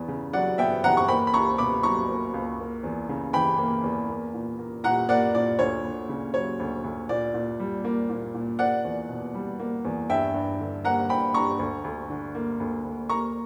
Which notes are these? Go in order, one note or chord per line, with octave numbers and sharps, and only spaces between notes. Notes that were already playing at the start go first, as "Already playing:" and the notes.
Already playing: E2 B3
C#3
F#3 D5 F#5
B3 E5 G5
E2 F#5 A#5
C#6
A#3 G5 B5
B5
C#2 A#5 C#6
B2 B5 D6
F#3 A#5 C#6
A#3
C#2
A#3
E2
C#3
E3 G5 B5
A#3
E2
A#3
A#2
A#3
A#2 F#5 A#5
A#3 D5 F#5
A#2 D5
D2 C#5
D2
C#3
F#3 C#5
D2
D2
A#2 D5
A#2
G3
A#3
A#2
A#2
A#3 D5 F#5
E2
B2
G3
A#3
E2
G2 E5 G5
G2
D3
A#3 F#5 A#5
G2 G5 B5
G2 A#5 C#6
D2
D2
D3
A#3
D2
D2
A#3 A#5 C#6